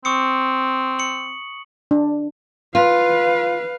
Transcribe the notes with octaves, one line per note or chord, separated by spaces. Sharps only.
C4 C#6 D#6 C#7
C#7 F#7
D4
F4 B4 F5